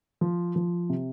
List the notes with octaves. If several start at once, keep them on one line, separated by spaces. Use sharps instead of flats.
F3
F3
C3